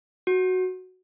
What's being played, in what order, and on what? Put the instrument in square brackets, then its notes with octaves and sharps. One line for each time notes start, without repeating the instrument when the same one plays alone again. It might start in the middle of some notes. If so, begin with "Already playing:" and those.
[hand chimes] F#4